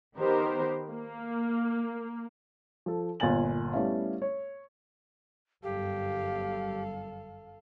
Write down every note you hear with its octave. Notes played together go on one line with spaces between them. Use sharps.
D#3 B3 G4 A#4 C5
A#3
F3 A4
G1 A#2 A#4 G#5 A6 F#7
G3 A3 B3 C#4 E4 F5
C#5
G1 F#2 G3 G4 A4 F5